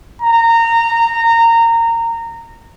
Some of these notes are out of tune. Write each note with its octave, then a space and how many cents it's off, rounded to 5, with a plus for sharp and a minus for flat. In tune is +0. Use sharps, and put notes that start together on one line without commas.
A#5 -20